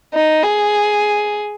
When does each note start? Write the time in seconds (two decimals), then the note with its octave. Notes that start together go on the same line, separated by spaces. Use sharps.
0.14 D#4
0.43 G#4